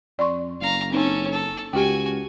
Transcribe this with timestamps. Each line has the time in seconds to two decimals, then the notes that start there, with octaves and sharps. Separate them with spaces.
0.19 F2 D5 C6 C#6
0.61 F#1 F5 A#5
0.91 C4 C#4 D#4 A4
1.31 A4
1.73 C#2 F#4 G4 G5 G#5